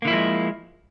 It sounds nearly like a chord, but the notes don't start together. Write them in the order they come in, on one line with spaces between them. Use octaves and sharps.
A#3 D3 E4 F3 G#3